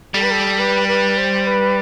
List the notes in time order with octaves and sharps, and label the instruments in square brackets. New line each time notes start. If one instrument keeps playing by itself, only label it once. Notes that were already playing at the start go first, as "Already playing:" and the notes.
[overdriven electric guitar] G3 [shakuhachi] A4
[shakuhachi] B4
A4
B4
B4
C5
B4